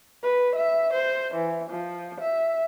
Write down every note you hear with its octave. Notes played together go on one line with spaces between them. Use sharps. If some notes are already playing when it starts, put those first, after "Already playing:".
B4
E5
C5
E3
F3
E5